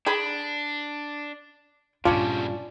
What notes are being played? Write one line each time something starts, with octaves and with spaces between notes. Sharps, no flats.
D4 G#4 B5
G2 A#2 C#3 G3 C#4 D4 F4